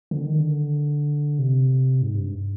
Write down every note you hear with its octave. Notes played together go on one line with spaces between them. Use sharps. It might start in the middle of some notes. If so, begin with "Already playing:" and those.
D3
D#3
D3
C3
G#2
G2